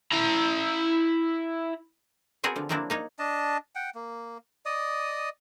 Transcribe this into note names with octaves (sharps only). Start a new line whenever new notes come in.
E4 A#5
B3 C4 F#4 G#4 A#4 F#5
D3 F3
F3 F#3 A#3 C4 D4 E4
A#3 D#4 C#5
D4 D#5 A5
F#5 G5
A#3
D5 D#5 D#6